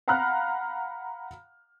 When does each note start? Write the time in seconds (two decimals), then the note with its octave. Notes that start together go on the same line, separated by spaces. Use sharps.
0.08 F5 F#5 A#5 B5 F6 F#6